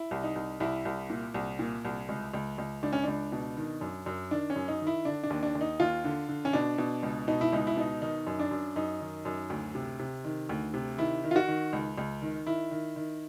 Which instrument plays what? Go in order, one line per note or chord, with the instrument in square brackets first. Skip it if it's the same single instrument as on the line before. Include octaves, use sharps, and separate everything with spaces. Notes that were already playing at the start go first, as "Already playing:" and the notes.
Already playing: [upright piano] E4
C2
D#4
C2
C2 E4
C2
A#2
C2
A#2
C2
C#2
C#2
C#2
C#2 D4
C#4
C#2 D4
B2
D#3
F#2
F#2
D#3 D4
C#4
F#2
D#4
D#3
E4
D3 D4
D4
D#2
D4
D#2
D#4
D#2 F4
D3
D3
C#4
B2 D4
B2
C#2
B2 D#4
E4
C#2 D#4
E4
B2 D#4
D#3 D#4
F#2
D4
F#2
F#2 D#4
D#3
F#2
D2
C3
C3
D#3
D2
C3
D#3 E4
D#3
F4
F#4
D#3
C#2
C#2
D#3
D#3 E4
D#3
D#3